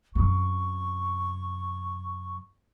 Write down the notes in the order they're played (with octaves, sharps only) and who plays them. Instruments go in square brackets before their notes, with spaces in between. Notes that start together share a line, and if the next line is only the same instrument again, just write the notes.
[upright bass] F#2 C3 [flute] C#6